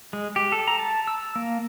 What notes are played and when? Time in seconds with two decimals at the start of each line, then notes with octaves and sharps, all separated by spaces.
0.13 G#3
0.36 G4
0.52 A4
0.68 A#5
0.79 A5
1.07 E6
1.36 A#3